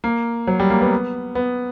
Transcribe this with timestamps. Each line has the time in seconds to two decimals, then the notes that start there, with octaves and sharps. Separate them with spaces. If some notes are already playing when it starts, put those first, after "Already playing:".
0.04 A#3
0.47 F#3
0.60 G3
0.70 A#3
0.81 B3
1.35 B3